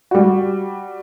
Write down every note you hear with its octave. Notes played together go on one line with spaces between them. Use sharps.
G3 F#4